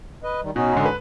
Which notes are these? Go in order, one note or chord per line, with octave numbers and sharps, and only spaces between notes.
B4 D#5
D#3 G3
B2 C#4 D#4 F#4
G#2 D3
B4